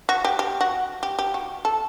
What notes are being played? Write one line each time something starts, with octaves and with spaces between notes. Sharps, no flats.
F#4
G4
G4
F#4
G4
G4
F#4
A4